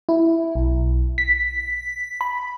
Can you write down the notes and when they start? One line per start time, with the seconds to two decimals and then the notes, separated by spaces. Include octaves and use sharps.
0.09 E4
0.55 B1
1.18 B6
2.21 B5